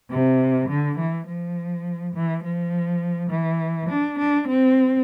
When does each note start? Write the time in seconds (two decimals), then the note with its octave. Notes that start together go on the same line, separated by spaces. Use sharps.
0.10 C3
0.69 D3
0.98 E3
1.27 F3
2.15 E3
2.44 F3
3.31 E3
3.90 D4
4.19 D4
4.48 C4